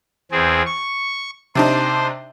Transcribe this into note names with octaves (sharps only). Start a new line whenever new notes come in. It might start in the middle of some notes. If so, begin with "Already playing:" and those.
E2 C4 G#4
C#6
C3 D4 D#4 C5